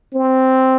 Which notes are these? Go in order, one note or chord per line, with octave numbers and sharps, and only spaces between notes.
C4